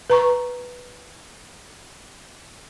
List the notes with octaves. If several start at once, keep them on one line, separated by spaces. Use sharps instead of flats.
B4 A#5 C#6